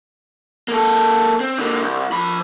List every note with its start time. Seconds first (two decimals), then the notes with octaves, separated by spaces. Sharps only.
0.68 A#3 A4
1.40 C4
1.59 D3 A#3
1.80 C2
2.12 F3 B5